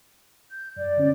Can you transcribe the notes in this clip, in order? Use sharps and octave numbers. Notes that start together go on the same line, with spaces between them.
G6
F#2 D5
D3 C#4